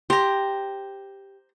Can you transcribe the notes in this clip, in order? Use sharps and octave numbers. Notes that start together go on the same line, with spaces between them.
G4 C5 A#5